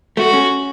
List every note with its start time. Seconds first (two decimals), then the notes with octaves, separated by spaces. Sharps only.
0.17 A3 F#4
0.33 C#4